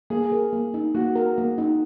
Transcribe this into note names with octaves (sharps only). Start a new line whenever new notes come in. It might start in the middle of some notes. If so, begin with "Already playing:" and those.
A#3 G#4
A#4
A#3
D#4
A#3 F#4
A#4
A#3
D#4